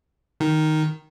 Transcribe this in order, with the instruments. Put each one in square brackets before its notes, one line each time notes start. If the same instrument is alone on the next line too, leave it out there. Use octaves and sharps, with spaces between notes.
[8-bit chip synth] D#3